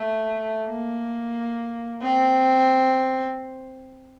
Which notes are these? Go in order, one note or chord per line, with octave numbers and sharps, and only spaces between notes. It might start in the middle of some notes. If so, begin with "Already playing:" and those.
Already playing: A3
A#3
C4